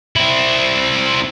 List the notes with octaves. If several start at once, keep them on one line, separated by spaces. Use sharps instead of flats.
C4 E4